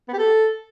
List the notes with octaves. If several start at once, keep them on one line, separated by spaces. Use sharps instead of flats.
B3
G4
A4